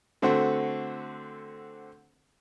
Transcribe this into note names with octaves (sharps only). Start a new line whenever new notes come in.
D3 A3 C4 F#4